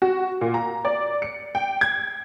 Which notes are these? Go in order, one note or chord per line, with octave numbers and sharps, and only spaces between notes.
F#4
A#2
A#5
D5
C#7
G5
G#6